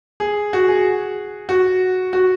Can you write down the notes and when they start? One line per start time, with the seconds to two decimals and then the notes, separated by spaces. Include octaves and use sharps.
0.20 G#4
0.53 F#4
0.68 G#4
1.49 F#4
2.13 F#4